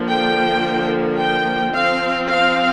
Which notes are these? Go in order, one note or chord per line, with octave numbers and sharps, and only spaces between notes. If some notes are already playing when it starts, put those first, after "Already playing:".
Already playing: D3 F3 A#3
G5
G5
F3 C4 F5
F5